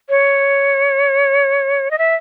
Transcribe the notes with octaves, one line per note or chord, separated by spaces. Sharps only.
C#5
D#5
E5